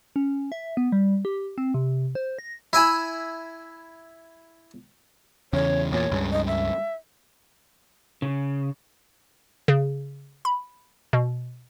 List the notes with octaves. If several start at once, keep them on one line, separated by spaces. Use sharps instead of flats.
C#4
E5
B3
G3
G4
C4
C3
C5
A#6
E4 E5 G#5 B5
E2 C#3 C#5
E2 A#2 C#5
C#2 G2 C#3
D#5
E5
C#3
C#3
B5
B2